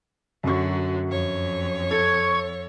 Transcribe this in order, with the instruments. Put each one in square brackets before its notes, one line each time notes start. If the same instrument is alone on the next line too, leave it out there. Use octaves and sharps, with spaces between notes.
[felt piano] F#2 C#6 [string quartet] D3 F#3
[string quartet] F2 C#5
[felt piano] A4 [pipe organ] C#6 G#6